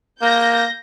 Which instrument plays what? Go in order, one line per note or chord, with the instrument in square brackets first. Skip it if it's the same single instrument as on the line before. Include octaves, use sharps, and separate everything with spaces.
[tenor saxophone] A#3 [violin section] G6 A#6